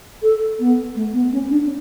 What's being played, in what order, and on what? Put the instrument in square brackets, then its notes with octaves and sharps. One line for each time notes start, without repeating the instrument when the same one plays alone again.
[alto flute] A4
B3
A3
B3
C#4
D4